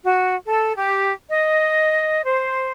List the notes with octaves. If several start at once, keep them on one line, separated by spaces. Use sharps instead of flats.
F#4
A4
G4
D#5
C5